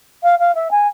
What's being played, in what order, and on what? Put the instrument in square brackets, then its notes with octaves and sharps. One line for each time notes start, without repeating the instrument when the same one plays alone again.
[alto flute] F5
F5
E5
G#5